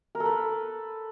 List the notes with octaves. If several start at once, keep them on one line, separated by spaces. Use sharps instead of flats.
A#4
A4
B4